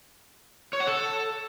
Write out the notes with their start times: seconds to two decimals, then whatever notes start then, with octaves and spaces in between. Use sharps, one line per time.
0.73 C#5
0.80 F#5
0.87 A4